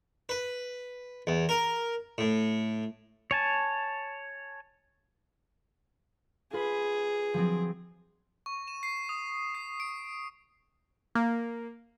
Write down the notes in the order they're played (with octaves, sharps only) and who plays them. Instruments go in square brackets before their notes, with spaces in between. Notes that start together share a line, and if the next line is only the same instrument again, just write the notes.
[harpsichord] B4
E2
A#4
A2
[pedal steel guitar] C#5 G#5 A5
[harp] F4 B4 [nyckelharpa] G#4
[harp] F3 F#3 C4
[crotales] C#6
E7
C7
D#6
C7
D7
[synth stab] A#3